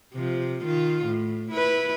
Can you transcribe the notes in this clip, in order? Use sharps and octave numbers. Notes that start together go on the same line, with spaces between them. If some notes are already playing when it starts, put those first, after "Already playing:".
C3 F3
D#3 F4
A2
E4 B4